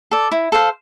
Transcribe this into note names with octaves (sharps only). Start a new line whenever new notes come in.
A4 D5
E4
A4 C5 F5